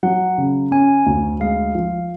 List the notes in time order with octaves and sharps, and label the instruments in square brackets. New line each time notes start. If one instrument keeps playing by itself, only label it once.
[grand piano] F#3 [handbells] F#5
[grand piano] C#3
[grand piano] C#4 [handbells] G#5
[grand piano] D2
[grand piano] G#3 [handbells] F5
[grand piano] F3